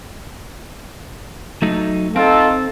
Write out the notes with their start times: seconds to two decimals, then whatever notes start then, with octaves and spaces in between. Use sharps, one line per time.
1.62 F#3 A3 D#4
2.16 C4 D#4 F4 A4